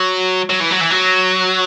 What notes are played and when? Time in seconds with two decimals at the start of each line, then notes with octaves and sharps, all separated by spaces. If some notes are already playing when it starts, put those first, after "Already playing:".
Already playing: F#3
0.50 F#3
0.60 E3
0.70 F#3
0.80 E3
0.90 F#3